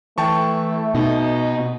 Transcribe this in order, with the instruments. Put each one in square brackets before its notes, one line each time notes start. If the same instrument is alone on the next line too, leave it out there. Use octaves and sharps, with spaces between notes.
[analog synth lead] E3 [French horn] A3 [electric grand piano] G5 A5 C#6
[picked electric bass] B2 [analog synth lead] D#4